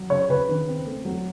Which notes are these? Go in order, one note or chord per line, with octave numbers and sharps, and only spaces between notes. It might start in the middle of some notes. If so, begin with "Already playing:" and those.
Already playing: F#3
C#3 C#5
C#3 B4
D#3
C4
A3
F#3